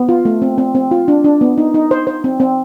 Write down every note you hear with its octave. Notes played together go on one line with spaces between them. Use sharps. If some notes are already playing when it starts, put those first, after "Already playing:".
Already playing: B3
F4
A3
C4
C4
C4
F4
D4
D4
B3
D#4
D#4
C5
C5
C4
C4